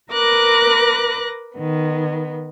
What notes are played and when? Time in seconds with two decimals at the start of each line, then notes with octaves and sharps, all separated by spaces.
0.11 A#4 B4 D6 F#6 A#6
1.56 D#3 B3